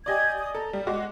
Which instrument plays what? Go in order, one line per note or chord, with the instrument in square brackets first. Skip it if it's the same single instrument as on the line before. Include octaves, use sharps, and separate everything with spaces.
[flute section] G4 G#6 [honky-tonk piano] D5 D#5 G#5
[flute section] D#6
[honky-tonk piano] A4 [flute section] A#5
[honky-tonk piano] G3
[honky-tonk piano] G#3 F#4 [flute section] D6